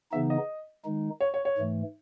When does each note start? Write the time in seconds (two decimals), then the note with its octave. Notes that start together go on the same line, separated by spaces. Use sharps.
0.12 C#3 E3 B3 D#4 E5
0.30 D#5
0.85 D#3 G#3 D#4
1.20 C#5
1.34 C#5
1.45 C#5
1.58 G#2 E3 A3